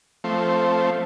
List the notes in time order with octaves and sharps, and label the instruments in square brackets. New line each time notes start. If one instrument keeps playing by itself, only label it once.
[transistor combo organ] F3 A3 C4